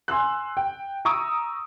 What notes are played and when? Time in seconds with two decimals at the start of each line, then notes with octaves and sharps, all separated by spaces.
0.08 G#5 C6 E6 F#6
0.57 G5
1.05 A#5 C#6 D#6 E6 D7